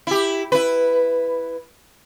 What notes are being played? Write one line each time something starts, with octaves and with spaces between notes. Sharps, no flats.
E4 G4
E4 B4